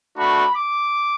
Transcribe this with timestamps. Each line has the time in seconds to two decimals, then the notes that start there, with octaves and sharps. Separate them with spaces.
0.16 A3 D4 F#4 B5
0.56 D6